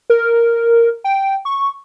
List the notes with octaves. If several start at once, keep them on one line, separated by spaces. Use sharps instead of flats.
A#4
G5
C#6